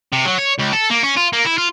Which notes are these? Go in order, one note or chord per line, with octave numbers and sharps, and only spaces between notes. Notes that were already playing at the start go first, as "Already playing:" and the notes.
C3
F#3
C#5
C#2
A4
A#3
C#4
F4
A#3
E4
F4